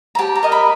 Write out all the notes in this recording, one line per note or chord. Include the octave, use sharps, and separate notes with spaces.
A#5
G4 A5
A#5
A#4 D#5
B5